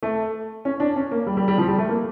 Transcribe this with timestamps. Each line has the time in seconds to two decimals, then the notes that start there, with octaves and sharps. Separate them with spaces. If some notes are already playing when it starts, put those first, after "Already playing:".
0.03 A3
0.65 C#4
0.80 D4
0.96 C#4
1.12 A#3
1.27 G3
1.37 G3
1.48 G3
1.58 F3
1.68 G3
1.78 A3
1.89 A#3